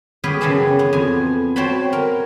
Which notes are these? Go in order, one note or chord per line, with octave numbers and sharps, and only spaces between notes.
B3 C#4 G4 G#4 B4
F#2 C#3 E3 G#4 A5
B3
F2 G#5
F#4 C5 C#5 G5 A5 B5
A#4